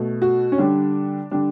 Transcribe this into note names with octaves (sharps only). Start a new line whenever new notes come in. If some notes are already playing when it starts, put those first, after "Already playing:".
Already playing: B2 A3
F#4
C#4
D3 G3 D4
D3 G3 D4